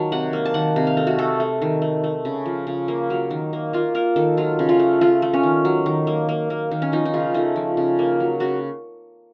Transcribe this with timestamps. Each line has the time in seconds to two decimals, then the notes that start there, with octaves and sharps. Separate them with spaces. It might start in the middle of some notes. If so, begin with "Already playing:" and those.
Already playing: D#3 F#3 A#3 A5
0.12 C3 F#5
0.33 A#3
0.45 A5
0.54 D#3 F#5
0.76 C3
0.87 F5
0.97 A3
1.07 F#4
1.19 A3 A4
1.40 A3
1.62 D#3
1.82 A3
2.04 A3
2.25 C#3
2.46 F3
2.67 C#3
2.88 A#3
3.10 F#3
3.30 D#3
3.53 A#3
3.73 A#3 F4
3.94 A#3 A#4
4.16 D#3 A4
4.37 F#3 F4
4.59 C#3
4.69 F4
4.80 A3
5.01 A3 F4
5.22 A3
5.34 C#4
5.43 D#3
5.65 F#3
5.86 D#3
6.07 A#3
6.29 A#3
6.50 A#3
6.71 D#3
6.82 C#4
6.92 F3 D#4
7.05 D#4
7.13 C#3 F4
7.34 A3 D#4
7.56 F3
7.77 C#3
7.99 A#3
8.20 F#3
8.40 C#3 F#4